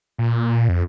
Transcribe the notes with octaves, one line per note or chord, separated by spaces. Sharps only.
A#2
F2